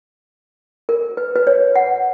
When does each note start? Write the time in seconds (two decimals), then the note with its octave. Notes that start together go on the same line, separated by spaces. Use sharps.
0.89 A#4
1.17 B4
1.36 B4
1.47 C#5
1.76 F#5